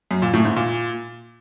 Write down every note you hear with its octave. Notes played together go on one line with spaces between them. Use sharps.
F#2
A#2
A2
G#2
A#2